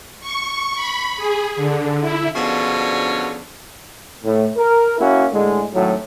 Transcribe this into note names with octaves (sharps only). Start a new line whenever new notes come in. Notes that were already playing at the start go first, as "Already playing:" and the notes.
C#6
B5
G#4
D3
E4
B2 D3 F3 C#4 D4 G#4
A2
A#4
A#3 C#4 E4 F#4
A2 D3 G#3
G#1 A2 F#3